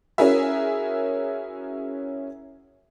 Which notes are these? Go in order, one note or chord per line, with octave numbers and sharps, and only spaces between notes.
C#4 E4 F#4 G#4 A#4 E5